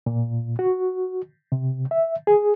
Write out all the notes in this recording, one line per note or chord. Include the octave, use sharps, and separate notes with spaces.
A#2
F#4
C3
E5
G#4